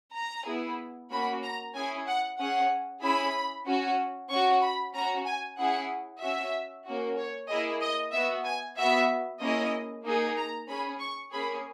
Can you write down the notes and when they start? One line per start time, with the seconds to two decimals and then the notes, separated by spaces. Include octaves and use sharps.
0.15 A#5
0.47 B3 E4 G#4
1.11 A#3 C#4 F#4 B5
1.43 A#5
1.75 C#4 E4 G#4 G#5
2.07 F#5
2.39 C#4 G#4 F#5
3.02 C#4 E4 G#4 B5
3.67 C#4 F#4
4.30 C#4 F#4 C#6
4.62 B5
4.94 C#4 F#4 A#5
5.25 G#5
5.58 C#4 E4 G#4 F#5
6.21 C#4 F#4 E5
6.86 A#3 C#4 F#4
7.17 C#5
7.49 A#3 E4 G#4 D#5
7.81 D#5
8.13 B3 F#4 E5
8.45 G#5
8.77 B3 F#4 E5
9.41 A#3 C#4 E4 G#4 D#5
10.04 A#3 D#4 G#4
10.36 A#5
10.68 C#4 G#4 B5
11.00 C#6
11.32 A#3 C#4 G#4 B5